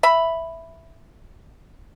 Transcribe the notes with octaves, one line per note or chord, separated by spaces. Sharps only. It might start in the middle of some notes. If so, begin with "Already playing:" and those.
E5 B5